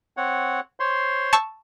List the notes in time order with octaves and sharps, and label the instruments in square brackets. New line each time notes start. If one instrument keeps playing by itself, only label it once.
[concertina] C4 C#5 F#5
C5 C#5 C6
[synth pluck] A5 C#6 E6